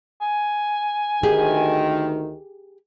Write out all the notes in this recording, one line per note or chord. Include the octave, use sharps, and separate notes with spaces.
G#5
D2 D#3 G4 G#4